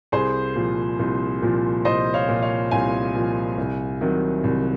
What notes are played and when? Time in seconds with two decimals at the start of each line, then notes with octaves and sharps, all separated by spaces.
0.12 C2 G#4 C5
0.55 A#2 F3
0.99 C2
1.42 A#2 F3
1.85 C2 C5 D#5
2.14 C#5 F5
2.28 A#2 F3
2.43 C#5 F5
2.71 C2 F5 G#5
3.15 A#2 F3
3.57 C2
4.01 C3 D#3 F#3
4.44 C2